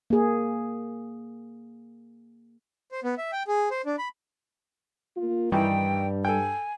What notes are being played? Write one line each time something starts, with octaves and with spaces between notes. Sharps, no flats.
A#3 G#4
C5
B3
E5
G5
G#4
C5
D4
B5
A#3 F4
G2 D#3 E3 G3 G5
A4 G5 G#5